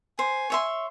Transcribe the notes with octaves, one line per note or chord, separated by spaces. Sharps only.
C5 G#5
C#5 E5 C6